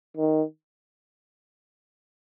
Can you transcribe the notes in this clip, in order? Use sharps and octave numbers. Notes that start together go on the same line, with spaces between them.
D#3